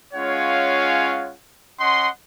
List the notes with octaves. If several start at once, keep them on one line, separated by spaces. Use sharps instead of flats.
G#3 C#4 F4 C#5 F5 F#5
C#4 D#5 F#5 C6